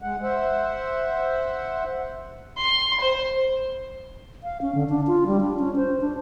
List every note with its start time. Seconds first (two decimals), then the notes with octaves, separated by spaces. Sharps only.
0.02 G#3 F#5
0.22 C5 E5 F#5
2.57 C6
3.00 C5
4.43 F5
4.61 C#4
4.75 D3
4.89 D4
5.07 F4
5.27 G3
5.41 D4
5.59 C#4
5.76 C5
6.00 D4